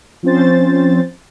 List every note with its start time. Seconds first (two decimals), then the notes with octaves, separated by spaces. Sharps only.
0.23 F3 C4 C#4 C5 A6